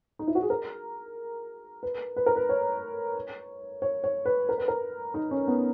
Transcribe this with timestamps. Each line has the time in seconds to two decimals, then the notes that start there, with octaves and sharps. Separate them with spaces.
0.19 D#4
0.27 E4
0.35 F#4
0.42 G#4
0.50 A#4
1.83 B4
2.16 B4
2.26 A#4
2.36 B4
2.49 C#5
3.82 C#5
4.04 C#5
4.25 B4
4.49 A#4
4.58 B4
4.68 A#4
5.14 D#4
5.31 C#4
5.48 B3